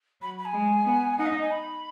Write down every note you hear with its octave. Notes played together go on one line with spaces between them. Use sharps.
F#3 B5
B5
G#5
G#3
B3
D#4 F#5
D#5
G#5
B5